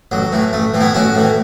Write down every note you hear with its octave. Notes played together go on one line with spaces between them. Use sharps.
A1 F#3
A2 E3
A1 A3
A2 E3
B3 E4
A1 C#4 F#4
A2 E3